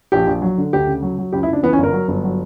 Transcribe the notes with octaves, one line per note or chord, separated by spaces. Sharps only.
A#1 G4
A#1
F#3
D3
D2 G4
C#3
F#3
F#3
C#2 G4
E4
C#2 D4
E3 B3
C#4
G1
A#4
F#3
G1
F#3